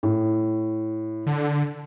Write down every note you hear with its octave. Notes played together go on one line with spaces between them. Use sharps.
A2
D3